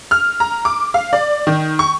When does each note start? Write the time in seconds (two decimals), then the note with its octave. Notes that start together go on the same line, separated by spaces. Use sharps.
0.11 F6
0.40 A#5
0.65 D6
0.94 F5
1.13 D5
1.47 D#3
1.79 C#6